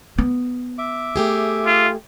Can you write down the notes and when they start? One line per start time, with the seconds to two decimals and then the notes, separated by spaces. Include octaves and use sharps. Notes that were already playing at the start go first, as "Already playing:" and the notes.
0.18 B3
0.78 E5 D6
1.16 A3 G4 G#4
1.66 F4